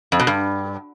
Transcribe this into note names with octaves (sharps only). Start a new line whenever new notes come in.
F2
B2
G2